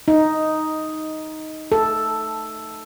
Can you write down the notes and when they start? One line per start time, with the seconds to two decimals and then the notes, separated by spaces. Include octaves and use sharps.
0.08 D#4
1.72 A4